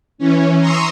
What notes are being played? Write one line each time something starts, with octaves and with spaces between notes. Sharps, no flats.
E3 C#4
A#5 C6 C#6 D#6 E6